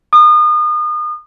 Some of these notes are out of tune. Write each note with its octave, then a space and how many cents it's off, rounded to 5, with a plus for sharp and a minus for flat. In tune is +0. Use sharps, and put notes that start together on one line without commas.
D#6 -35